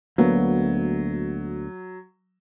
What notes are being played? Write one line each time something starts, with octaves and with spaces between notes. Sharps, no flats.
D2 F#3 A#3 B3